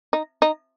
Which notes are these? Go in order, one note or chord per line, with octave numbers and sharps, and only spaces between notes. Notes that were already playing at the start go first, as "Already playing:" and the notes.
D#4
D#4